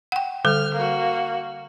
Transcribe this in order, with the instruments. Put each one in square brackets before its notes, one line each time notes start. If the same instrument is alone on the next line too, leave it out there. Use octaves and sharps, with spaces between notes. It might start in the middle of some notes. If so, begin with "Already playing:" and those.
[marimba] F#5 G5
[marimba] D3 G3 A4 [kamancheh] F6
[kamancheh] A#3 F#4